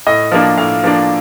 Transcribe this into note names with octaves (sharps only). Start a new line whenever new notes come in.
A2 D#5
F3 A#3 D4
A2 F5
F3 A#3 D4